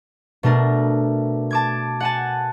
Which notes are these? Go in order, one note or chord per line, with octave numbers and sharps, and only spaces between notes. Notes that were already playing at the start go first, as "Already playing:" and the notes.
B2 A3 D4 A#4
A5 D6 G#6
F#5 G#5 A5